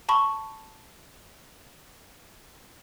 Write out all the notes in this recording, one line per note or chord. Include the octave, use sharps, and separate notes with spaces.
A5 B5 C#6